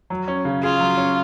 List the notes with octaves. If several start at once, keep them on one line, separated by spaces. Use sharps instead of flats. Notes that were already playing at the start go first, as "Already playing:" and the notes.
F#3
C#4
C#3
F4 G#4
F#3
C#4